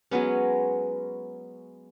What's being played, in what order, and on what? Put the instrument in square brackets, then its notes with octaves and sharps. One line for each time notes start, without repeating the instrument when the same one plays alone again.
[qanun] F#3 G#3 B3 C#4